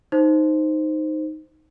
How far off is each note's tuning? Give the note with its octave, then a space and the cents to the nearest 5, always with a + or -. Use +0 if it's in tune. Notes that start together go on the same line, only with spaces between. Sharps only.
D#4 +0 C5 +0